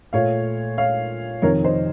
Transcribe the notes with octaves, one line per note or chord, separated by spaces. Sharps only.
A#2 A3 C#5 F5
C#5 F5
F2 C3 D#3 A#4 C#5
C5 D#5